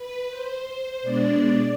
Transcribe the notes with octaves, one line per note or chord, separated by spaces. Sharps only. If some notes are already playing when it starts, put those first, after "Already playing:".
Already playing: B4
C5
B2 G#3 D4 D5